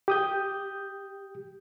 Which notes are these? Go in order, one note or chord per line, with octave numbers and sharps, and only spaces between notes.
G4 D#6 G6